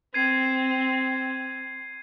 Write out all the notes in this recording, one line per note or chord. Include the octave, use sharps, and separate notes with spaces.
C4 G#6 C7 D#7